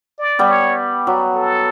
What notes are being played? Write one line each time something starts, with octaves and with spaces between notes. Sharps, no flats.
D5
G3 B3
C#5
F#3
A4